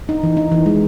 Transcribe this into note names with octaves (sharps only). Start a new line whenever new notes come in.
D#4
E3
D#4
E3
G#3